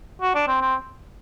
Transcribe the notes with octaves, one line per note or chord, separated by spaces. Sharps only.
F#4
D4
C4
C4